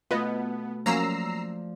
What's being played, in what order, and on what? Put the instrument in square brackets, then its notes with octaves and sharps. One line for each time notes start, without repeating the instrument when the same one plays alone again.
[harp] B2 A3 [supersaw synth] B3 [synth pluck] F4 B4 D#5
[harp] F3 D5 [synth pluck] F#3 A#3 C#4 [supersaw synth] A#5 E6 C7